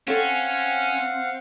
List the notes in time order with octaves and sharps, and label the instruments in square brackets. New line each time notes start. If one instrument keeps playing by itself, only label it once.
[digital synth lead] C4 [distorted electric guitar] C#4 [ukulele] A4 C#5 [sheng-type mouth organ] F5 F#5